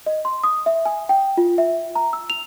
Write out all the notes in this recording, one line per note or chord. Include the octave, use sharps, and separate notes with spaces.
D#5
C6
D#6
E5
G#5
G5
F4
E5
A#5
E6
F7